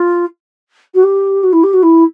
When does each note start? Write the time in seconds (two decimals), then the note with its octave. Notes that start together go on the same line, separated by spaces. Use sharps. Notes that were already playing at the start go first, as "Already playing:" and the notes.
Already playing: F4
0.94 F#4
1.03 G4
1.43 F#4
1.53 E4
1.63 G4
1.73 F#4
1.83 E4